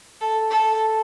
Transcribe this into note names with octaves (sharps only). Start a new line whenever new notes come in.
A4
A4